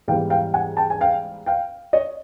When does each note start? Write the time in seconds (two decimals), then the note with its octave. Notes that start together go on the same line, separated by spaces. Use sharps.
0.08 G#2 E3 G3 B3 F5 G5
0.30 F5 G5
0.54 F#5 G#5
0.77 G5 A5
0.90 G#5
1.01 F5 G5
1.46 F5 G5
1.93 C#5 D#5